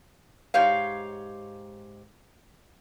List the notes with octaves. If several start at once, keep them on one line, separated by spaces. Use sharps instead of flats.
G#2 G4 C#5 F5